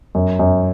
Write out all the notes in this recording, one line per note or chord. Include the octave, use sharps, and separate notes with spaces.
F#2
F#2